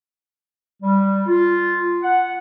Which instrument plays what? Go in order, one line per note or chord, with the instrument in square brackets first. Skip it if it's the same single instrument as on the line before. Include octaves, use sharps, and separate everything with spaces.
[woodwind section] G3
F4
F#5